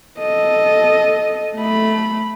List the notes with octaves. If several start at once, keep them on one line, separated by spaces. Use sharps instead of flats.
A4 D#5
A3 B5